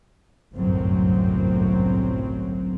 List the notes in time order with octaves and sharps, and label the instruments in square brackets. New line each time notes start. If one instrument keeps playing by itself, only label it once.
[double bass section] G1 C2 F#2 A2 F#3 C4